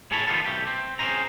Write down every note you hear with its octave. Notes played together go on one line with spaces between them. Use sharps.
A2 G#4 A4 C#5 A5 B5
D#3 F3 G3 B3 F4 A4
B1 A3 G4
C4
C4 C#4 E4 G#4 C5 A#5